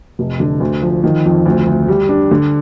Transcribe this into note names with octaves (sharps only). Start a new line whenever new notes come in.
F1
D3
D2
F3
D#3
F2
D2
D2
G3
D4
D3